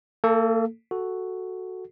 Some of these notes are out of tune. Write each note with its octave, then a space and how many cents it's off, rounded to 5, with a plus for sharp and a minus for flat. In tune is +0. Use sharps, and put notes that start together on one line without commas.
A#3 -40 A4 +0
F#4 +0 A4 +0